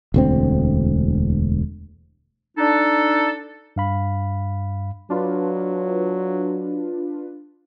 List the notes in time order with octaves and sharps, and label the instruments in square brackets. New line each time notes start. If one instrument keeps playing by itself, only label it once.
[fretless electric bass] E1 D2 C4
[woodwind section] D4 D#4 A4
[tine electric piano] G2 F5 B5
[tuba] F#3 [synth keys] D4 F4 B4